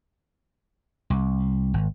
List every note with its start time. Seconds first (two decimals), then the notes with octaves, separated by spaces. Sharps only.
1.10 C2
1.74 G#1